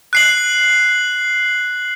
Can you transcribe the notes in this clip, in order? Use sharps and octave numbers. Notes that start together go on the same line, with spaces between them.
F#6 C7 F#7